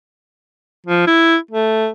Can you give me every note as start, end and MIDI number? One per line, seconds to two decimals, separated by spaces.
0.86 1.07 53
1.07 1.36 64
1.51 1.88 57